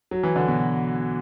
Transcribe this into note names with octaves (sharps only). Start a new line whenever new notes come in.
F#3
E3
D3
B2